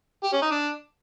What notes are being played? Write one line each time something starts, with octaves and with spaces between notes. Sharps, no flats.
G4
C#4
D#4
D4